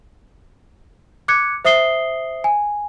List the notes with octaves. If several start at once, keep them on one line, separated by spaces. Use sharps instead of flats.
D6 F#6 G#6 C#7
C5 E5 D#6 C7 G7
G#5